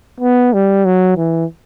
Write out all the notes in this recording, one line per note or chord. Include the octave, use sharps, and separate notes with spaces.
B3
G3
F#3
E3